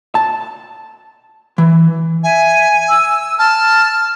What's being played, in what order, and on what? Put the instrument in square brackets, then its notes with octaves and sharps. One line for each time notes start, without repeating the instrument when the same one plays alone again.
[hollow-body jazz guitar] A5
E3
[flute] E5 [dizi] G#5
[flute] E6
[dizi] A5 [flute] F6